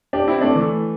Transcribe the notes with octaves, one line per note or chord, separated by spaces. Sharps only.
D4 G4
C4 E4
A3 D4
E3 A3